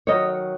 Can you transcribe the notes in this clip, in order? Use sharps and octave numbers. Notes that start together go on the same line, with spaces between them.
D#3 F#3 C#5 D#5